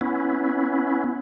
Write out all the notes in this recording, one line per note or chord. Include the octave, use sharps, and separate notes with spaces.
B3 C#4 E4